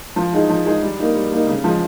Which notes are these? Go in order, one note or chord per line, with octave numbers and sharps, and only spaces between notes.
F3
G#3 D#4 G#4
F3
G#3 D#4 G#4
G3
A#3 D#4
G3
A#3 D#4
C#3
F3 G#3